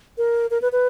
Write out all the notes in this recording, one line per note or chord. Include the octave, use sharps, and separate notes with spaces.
A#4
A#4
B4
B4